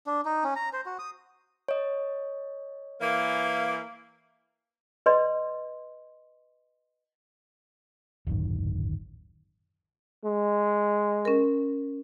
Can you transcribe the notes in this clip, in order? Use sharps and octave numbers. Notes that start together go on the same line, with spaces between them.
D4
D#4
C#4
A#5
C5
F#4
D#6
C#5 D#5
E3 A#3
B4 D5 D#5 C6
D1 G#1 F#2 D#3
G#3
C#4 A#4